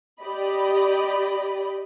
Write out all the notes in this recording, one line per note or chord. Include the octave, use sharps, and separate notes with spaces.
G4 D5 D#5 B5